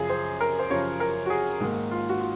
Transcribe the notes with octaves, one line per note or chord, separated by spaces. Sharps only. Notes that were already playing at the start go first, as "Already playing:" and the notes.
Already playing: F#2 C#3 F3 G#4
C5
A#4
C5
F#2 C#3 F3 C#5
A#4
F#4
G#4
G#2 D#3 A#3
F4
F#4
F4